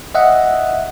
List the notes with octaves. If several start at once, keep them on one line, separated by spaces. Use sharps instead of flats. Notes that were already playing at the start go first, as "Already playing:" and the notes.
D#5 E5 F#5